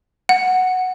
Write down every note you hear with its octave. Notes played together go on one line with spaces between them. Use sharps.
F#5